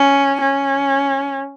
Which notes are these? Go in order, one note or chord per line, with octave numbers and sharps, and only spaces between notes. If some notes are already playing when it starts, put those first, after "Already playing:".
Already playing: C#4
C#4